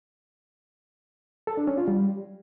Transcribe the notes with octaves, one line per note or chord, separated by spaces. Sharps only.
A4
D4
C#4
F4
G3